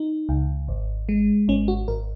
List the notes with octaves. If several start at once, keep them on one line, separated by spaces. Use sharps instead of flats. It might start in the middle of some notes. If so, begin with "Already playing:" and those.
Already playing: D#4
C#2
G#1
G#3
G#1 C#4
F#4
G#1 A#4